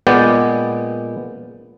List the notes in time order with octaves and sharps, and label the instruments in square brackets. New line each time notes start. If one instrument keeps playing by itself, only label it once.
[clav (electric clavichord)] A#2 G#3 B3 D5 G5